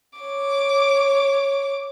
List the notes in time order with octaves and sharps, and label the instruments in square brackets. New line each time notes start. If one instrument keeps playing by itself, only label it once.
[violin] C#5 D6